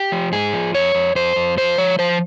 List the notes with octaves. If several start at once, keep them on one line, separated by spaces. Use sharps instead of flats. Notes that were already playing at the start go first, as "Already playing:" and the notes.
Already playing: G4
F3
G#2 G#4
F3
F2 C#5
F2
F2 C5
F2
F3 C5
F3 C#5
F3 C5